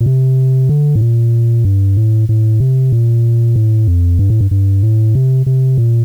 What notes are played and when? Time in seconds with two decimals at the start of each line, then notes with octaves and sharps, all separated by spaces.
0.01 A#2
0.06 C3
0.69 D3
0.95 A2
1.01 A#2
1.65 G2
1.96 A2
2.29 A2
2.60 C3
2.92 A#2
3.56 A2
3.87 F2
4.19 G2
4.30 A2
4.41 G2
4.51 G2
4.83 A2
5.15 C3
5.46 C3
5.78 A#2